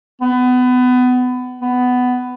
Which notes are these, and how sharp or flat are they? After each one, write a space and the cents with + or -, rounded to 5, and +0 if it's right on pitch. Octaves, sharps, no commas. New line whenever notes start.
B3 +25
B3 +15